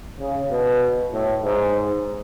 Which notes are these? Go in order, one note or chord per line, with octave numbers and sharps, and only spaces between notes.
C#3
B2
A2
G#2